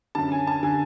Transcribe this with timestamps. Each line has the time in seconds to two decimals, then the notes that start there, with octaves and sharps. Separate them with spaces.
0.15 F#2 D3 A5
0.32 G#5
0.47 A5
0.63 D3 G#5